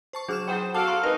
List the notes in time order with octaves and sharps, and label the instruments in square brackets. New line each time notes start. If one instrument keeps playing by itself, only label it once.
[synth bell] C5 A5 C#6
[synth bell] F#3 F6 E7 [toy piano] D4 G#4 C5
[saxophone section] B3 G#4 C5 [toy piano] E4 F#5 G5
[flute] F#4 [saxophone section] A4 F5 [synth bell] A5 D7 [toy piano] D6
[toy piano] A#5 C6 C#6
[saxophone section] G#3 C4 D#4 [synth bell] A#4 [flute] B4